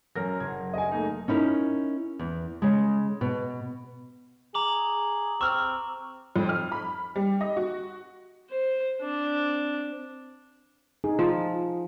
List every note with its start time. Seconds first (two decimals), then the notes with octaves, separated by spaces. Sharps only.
0.16 F#2 F#3 A#4 A#6
0.40 F#1 G#6
0.74 D#5 G#5
0.92 A3 A#3 D#4
1.28 C#4 D#4 E4 A#4
2.19 E2
2.62 C#3 G#3
3.21 B2
4.54 G#4 A#5 D6 F#7
5.41 C4 C#6 E6 F6
6.36 F2
6.49 F6
6.72 B5
7.16 G3
7.41 D#5
7.57 F#4
8.50 C5
9.01 C4 D4
11.04 D#4 G#4
11.19 F3